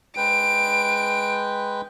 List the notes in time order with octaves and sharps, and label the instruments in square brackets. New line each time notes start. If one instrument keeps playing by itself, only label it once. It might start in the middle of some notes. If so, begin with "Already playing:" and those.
[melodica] G#3 B4 G5 [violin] D7